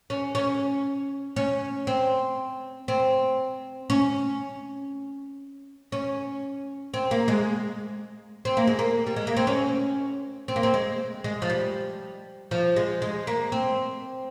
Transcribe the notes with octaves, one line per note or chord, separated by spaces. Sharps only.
C#4
C#4
C#4
C4
C4
C#4
C#4
C4
A#3
G#3
C4
A#3
G#3
A#3
G3
G#3
A#3
C4
C#4
C4
A#3
C4
G#3
G#3
F3
G3
F3
G#3
G#3
A#3
C4